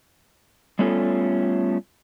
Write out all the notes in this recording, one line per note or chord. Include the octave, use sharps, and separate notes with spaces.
G3 A3 B3 C#4 F4 A4